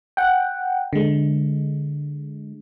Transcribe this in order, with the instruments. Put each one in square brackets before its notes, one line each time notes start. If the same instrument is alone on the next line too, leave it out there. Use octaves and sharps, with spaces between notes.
[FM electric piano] F#5 G5
D3 G#3